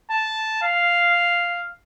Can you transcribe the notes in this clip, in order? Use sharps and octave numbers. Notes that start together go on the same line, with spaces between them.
A5
F5